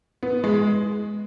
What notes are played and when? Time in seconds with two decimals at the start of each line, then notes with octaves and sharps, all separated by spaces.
0.23 B3
0.44 G#3